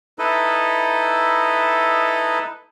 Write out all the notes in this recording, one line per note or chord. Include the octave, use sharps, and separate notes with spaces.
D#4 E4 A4 B4 D#5